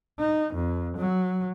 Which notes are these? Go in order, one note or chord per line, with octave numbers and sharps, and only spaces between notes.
D#4
F2
F#3